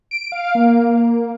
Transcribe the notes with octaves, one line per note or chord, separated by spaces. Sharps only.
D7
F5
A#3